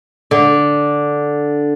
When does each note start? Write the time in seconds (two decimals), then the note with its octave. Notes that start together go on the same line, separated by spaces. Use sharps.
0.31 D3